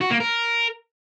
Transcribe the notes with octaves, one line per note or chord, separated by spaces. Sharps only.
F#4
A#3
A#4